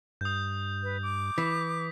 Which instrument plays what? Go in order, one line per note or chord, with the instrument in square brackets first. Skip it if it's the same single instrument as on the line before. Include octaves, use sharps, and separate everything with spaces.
[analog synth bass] G2 [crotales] D#6 G6
[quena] B4
D6
[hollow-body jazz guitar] E3 [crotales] B6